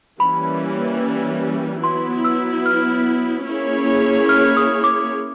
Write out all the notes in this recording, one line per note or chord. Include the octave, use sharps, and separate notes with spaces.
E3 G3 A#3 C#4 B5
F#3 B3 E4 C6
E6
F6
A#3 C#4 E4 G#4 C#5
F6
D#6
D6